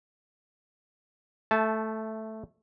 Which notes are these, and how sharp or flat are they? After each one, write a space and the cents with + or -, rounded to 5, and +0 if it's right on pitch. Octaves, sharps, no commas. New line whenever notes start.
A3 +0 A5 -20